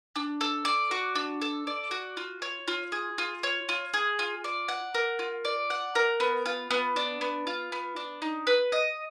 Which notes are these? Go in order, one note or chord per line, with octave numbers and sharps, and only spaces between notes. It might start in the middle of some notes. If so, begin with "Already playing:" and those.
D4
A4
D5
F#4
D4
A4
D5
F#4
F4
C#5
F4
G#4
F4
C#5
F4
G#4
F4
D5
F#5
A#4
F4
D5
F#5
A#4
B3
F4
B3
D4
B3
F4
B3
D4
D#4
B4
D#5